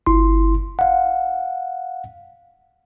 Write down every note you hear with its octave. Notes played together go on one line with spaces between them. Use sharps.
G1 E4 C6
F5 F#5